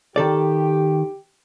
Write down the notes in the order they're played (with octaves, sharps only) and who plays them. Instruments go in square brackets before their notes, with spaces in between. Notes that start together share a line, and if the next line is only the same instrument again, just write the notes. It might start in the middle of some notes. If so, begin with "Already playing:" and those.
[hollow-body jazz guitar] D#3 A4 D5 [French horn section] G4